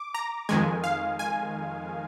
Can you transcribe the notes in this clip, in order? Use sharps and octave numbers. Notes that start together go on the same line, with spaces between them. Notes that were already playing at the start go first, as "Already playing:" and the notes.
Already playing: D6
A#5
F2 D#3 G#3 G#5
F5
G#5